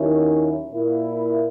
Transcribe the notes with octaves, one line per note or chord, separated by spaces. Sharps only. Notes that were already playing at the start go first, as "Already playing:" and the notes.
Already playing: D#2 D#3 F#3 C#4 E4
A#2 A#3 E4